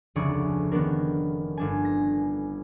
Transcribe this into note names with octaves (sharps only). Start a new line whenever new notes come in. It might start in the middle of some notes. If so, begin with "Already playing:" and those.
F1 D2 C#3 G#4 D5 C#6
D#3 B3 C#4 D4 A#4
G1 D4 G#5
A#6